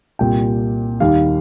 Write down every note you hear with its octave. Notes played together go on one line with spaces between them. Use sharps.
C2 A#2 G3 G5
D#2 D#3 G3 F5